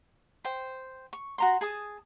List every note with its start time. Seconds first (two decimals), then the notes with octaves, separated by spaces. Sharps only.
0.45 C5 G5
1.13 C#6
1.38 F#4 A#5 C6
1.61 G#4 A5 D#6